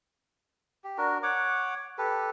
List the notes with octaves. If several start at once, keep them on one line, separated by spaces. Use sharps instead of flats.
G4
D4 F#4 A#4
C#5 F#5 D6
G4 A4 B4